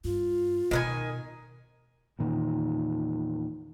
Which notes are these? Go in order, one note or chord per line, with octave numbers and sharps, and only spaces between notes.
G2 F4
B2 D#3 B4 G#5
E2 A#2 D#3